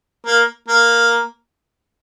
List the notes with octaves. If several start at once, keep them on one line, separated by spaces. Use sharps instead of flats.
A#3
A#3